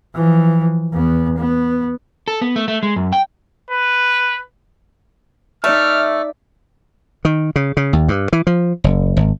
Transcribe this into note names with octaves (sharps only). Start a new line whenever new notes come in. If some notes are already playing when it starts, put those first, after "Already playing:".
E3 F3
E2 B3
B3
A4
B3
A3
A3
G#3
F#2
G5
B4
A3 D#4 D5 E5 F6
D#3
C#3
C#3
D#2
G2
E3
F3
F#1
G#1